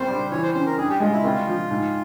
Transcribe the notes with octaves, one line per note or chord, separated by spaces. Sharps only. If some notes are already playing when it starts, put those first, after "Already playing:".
Already playing: C2 C5
G3
E3 C#5
C5
C#4 C5
A#4
G2 G#4
G4
G#3 F4
E4
C2 F4
F3
G#2